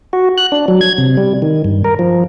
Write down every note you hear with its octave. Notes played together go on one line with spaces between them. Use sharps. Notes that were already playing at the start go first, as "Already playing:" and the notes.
F#4
F#6
D4
F#3
G#6
C3
G3
D#3
G2
A#4
F3